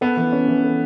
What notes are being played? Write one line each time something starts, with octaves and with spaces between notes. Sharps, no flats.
B3 A4
E3
C#4
E3
A4